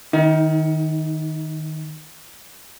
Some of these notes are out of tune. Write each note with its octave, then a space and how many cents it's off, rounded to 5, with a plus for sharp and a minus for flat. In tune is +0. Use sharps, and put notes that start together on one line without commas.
D#3 +0 D#4 +40